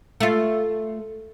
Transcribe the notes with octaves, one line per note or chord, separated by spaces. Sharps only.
A3 F4